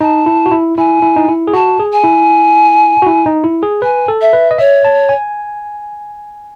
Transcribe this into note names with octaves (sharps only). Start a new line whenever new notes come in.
D#4 A5
E4
F#4
E4
E4 G#5
E4
D#4
E4
G#4
F#4 A5
G#4
G#5
E4
F#4
E4
D#4
E4
G#4
B4 G#5
A4
E5
B4
D#5
C#5 E5
A5
G#5